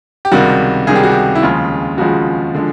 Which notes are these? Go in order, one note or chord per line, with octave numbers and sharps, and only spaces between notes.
G4
C#2 C3 D#3 G3 F#4
C#2 C3 D#3 G3 G#4
G4
F#4
G4
E4
D#2 C#3 F3 G#3 F4
D#2 C#3 F3 G#3 F#4
D3 F3 G#3